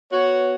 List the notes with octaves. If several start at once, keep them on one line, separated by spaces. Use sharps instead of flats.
B3 F#4 C#5